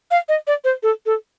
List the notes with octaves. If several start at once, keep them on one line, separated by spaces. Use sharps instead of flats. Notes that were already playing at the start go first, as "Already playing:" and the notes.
F5
D#5
D5
C5
A4
A4